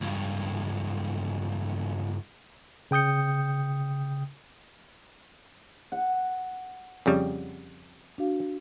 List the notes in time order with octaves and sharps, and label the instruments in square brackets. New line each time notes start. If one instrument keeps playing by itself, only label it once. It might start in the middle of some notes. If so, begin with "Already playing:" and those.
[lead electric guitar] C#2 G2
[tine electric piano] C#3 G5 D#6 G6 C#7
[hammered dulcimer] F#5
[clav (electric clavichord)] F2 C#3 G3
[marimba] D4 F#4 F5